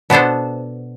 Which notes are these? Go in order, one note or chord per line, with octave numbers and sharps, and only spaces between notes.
B2 B3 D4 A4 C5